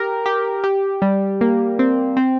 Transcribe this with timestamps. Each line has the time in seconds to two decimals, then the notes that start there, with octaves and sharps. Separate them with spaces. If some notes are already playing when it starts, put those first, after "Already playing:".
Already playing: G4 A#4
0.26 G4
0.64 G4
1.02 G3
1.41 A#3
1.79 C4
2.17 C4